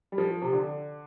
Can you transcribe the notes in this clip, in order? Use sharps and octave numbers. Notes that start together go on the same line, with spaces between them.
G3
F3
C3
D3